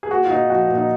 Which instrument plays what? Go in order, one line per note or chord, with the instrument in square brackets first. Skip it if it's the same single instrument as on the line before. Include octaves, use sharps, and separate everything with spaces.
[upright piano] G#4
A#3 F#4
F4
A#2 D#4
F3 F#4
A#2
D#4